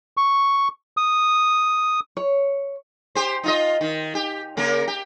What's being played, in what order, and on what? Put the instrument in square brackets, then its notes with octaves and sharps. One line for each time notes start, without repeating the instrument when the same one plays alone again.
[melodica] C#6
D#6
[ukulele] C#5
[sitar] G4 C5
D#4 F4 D#5
D#3
G4
C#3 A#3 A#4
G4